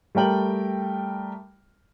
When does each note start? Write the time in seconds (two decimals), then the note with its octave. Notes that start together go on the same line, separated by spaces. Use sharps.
0.15 G3 A3 A#4 G5 F#7